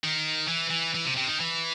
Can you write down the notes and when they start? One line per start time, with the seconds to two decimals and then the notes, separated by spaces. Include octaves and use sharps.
0.04 D#3
0.49 E3
0.71 E3
0.95 E3
1.05 C3
1.17 C3
1.28 D#3
1.40 E3